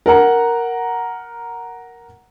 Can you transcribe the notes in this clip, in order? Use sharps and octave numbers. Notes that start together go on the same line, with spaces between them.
A#4 F#5 A#5